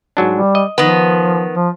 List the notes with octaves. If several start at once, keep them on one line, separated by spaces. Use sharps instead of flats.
G#2 F#3 D4
G3
D#5
D#3 F3 B3
F3